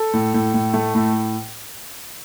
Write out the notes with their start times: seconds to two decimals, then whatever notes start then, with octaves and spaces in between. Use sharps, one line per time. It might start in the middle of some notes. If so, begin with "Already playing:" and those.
Already playing: A4
0.14 A2
0.34 A2
0.54 A2
0.74 A3
0.95 A2